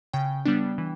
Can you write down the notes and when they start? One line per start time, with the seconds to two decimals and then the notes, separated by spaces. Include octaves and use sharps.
0.13 C#3 G5
0.46 G3 B3 D4
0.78 E3